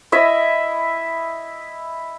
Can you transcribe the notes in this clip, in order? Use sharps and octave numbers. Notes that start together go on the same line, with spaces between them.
E4 D#5 E5